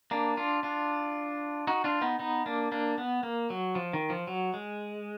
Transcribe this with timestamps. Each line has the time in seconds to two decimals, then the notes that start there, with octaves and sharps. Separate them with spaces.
0.11 A#3 D4
0.37 D4 F4
0.63 D4 F4
1.67 D#4 F#4
1.84 D4 F4
2.02 B3 D#4
2.19 B3 D#4
2.46 A#3 D4
2.72 A#3 D4
2.98 B3
3.23 A#3
3.50 F#3
3.75 F3
3.93 D#3
4.10 F3
4.27 F#3
4.54 G#3